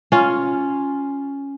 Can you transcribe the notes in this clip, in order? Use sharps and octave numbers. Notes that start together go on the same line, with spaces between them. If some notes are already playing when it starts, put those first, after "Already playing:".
C#4 F4